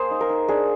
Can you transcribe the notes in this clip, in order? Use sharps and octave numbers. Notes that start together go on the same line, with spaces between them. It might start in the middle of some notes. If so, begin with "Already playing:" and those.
Already playing: A#3 G#4 C5
D#4
A#4
D#4
D4 G#4